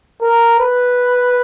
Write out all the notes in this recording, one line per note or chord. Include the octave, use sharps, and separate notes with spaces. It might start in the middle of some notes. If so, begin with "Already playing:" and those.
A#4
B4